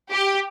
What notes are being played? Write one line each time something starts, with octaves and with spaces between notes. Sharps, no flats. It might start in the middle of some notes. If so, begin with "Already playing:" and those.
G4